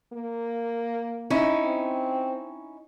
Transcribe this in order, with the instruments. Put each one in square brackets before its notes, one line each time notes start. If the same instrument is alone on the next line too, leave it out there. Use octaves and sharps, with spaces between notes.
[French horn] A#3
[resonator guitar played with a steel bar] C#4 D#4 E4
[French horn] C4